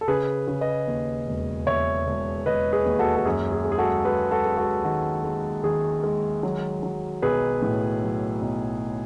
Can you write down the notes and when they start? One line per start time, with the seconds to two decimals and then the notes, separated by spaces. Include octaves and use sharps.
0.01 A4
0.08 C#3 G#4 B4
0.48 C#3
0.61 B4 D#5
0.87 D#2
1.27 E1
1.67 E1 C#5 E5
2.07 E1
2.46 E1 B4 D#5
2.73 G#4 B4
2.86 D#2
2.99 F#4 A4
3.16 A4
3.25 F#2 G#4
3.52 G#4
3.65 G#3
3.72 G#4
3.78 F#4 A4
4.05 G#3 G#4 B4
4.31 F#4 A4
4.45 G#3
4.58 F#4 A4
4.84 D#3 F#4
5.24 G#3
5.63 D#3 G#4
6.03 G#3
6.43 F#3
6.83 F#3
7.22 B1 G#4 B4
7.62 A2
8.02 F#3
8.42 B1